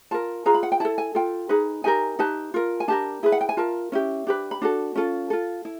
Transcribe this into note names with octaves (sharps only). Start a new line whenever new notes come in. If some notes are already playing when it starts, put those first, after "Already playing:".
F4 A#4 A5
F4 G#4 B4 A#5
B5
F#5
G5
E4 A4 A5
G#5
F4 A4 G5
D#4 G#4 B4
D#4 G4 A#4 G#5
D#4 G4 B4 A5
F4 A#4
G#5
D4 G4 A#4 A5
E4 G#4 B4
F#5
G5
G#5
F4 A#4 A5
C#4 E4 G4
D4 G4 B4
B5
D4 F#4 A4
C#4 F4 A4
F4 A4
E4